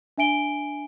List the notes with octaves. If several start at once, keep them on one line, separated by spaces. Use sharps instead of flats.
D4 E5 G#5 D7 G7